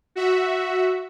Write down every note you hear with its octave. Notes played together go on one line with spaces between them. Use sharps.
F#4 E5